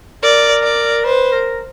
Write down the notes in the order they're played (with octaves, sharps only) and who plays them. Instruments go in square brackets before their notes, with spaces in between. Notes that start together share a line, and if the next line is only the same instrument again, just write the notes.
[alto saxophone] A#4 [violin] D5
[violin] D5
[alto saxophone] B4 [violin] C5
[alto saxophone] A#4